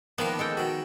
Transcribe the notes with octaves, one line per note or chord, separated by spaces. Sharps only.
D#3 F3 A#3 B3 D4
G#3 A4 G5
D#3 F#4